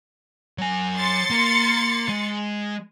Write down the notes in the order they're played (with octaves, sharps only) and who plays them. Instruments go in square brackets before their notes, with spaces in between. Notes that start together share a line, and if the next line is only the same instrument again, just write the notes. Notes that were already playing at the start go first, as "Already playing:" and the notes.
[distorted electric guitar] F#3 G#5
[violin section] C6 A6 C#7
[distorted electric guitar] A#3 A#4
G#3